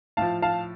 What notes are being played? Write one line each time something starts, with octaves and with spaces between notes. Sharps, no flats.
A2 F3 F5 A5
F5 A5